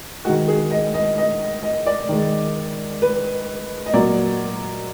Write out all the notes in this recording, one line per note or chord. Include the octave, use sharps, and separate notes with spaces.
D#3 G#3 F#4
G#4
D#5
D#5
D#5
D#5
D5
D#3 G#3
B4
D#5
A#2 F#3 A#3 D5